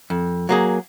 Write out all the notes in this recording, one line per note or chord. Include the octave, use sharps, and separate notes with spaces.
F2
F#3 A#3 G#4